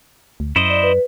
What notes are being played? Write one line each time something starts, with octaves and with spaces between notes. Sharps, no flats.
D2
F#2 E4 C5 D#5
D5
B4